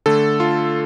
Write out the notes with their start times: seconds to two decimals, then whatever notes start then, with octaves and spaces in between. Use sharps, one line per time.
0.06 D3 A3 A4
0.40 F4